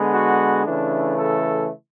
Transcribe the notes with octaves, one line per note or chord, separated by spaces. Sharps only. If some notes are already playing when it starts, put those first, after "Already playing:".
Already playing: D3 G#3 B3
F#4
C#3 E3 A3 D4
A4